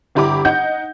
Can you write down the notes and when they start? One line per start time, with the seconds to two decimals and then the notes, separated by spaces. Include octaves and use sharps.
0.15 G1 E4 G4 A#5 B5 D6
0.45 D#4 F#5 G6